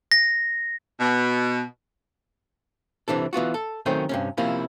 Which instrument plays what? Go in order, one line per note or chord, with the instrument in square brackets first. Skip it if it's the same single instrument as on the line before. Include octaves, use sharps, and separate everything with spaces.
[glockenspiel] A#6
[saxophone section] B2
[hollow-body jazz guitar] C3 E3 D4 A4
E3 B3 F4 F#4
A4
D#3 F#3 A3 C4 C#4
G2 C3 C#4
C3 F3 A#3 C#4 E4